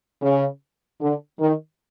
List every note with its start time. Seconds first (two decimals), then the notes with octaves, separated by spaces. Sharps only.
0.22 C#3
1.01 D3
1.39 D#3